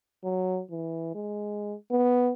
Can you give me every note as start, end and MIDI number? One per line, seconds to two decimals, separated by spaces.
0.24 0.61 54
0.71 1.14 52
1.15 1.74 56
1.91 2.32 59